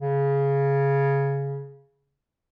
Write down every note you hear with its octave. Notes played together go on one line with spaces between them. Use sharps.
C#3